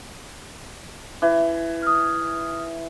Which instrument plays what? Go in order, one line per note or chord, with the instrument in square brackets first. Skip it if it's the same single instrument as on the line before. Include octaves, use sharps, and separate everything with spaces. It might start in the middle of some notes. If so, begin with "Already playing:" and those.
[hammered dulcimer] E3
[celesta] D#6 F6